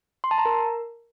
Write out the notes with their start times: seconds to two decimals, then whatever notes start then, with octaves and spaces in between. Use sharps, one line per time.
0.24 C6
0.31 A5
0.38 A#5
0.45 A#4